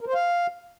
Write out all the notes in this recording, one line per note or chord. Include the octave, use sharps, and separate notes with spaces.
A#4
C5
F5